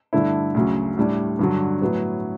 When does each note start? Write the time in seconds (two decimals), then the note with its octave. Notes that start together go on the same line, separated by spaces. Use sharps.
0.13 G2 D3 A3 E4
0.54 D2 C#3 F#3
0.97 A2 G3 D4
1.39 G2 D3 F#3
1.81 A2 F#3 B3